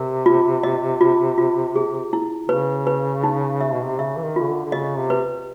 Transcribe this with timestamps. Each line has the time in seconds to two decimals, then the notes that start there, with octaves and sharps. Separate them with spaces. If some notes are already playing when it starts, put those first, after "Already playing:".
Already playing: C3 A#4
0.26 F4
0.63 D#5
1.01 F4
1.38 F4
1.76 G#4
2.13 E4
2.49 C#3 B4
2.87 B4
3.23 D#4
3.61 E5
3.74 B2
3.86 C3
3.99 C#3 E5
4.16 E3
4.23 D#3
4.36 F4
4.41 C#3
4.48 D3
4.66 D3
4.72 C#3 D#5
4.98 C3
5.10 B4